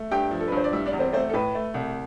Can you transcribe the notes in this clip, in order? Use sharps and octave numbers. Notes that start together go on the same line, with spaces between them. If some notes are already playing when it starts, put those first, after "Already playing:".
Already playing: A3
G2 G4 G5
F3
A4
B4
G2 C5
D5
G3 E4 E5
D4 D5
E2
C4 C5
A3 C4 C5
A4
A2 B4
A3
C2